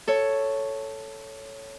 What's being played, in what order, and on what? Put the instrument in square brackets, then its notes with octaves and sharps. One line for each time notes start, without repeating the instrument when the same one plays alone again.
[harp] A4 C#5